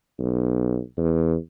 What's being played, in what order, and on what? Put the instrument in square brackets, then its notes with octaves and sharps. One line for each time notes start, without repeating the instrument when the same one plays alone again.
[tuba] B1
E2